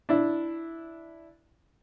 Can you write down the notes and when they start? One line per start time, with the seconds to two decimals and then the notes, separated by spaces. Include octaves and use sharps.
0.09 D4 E4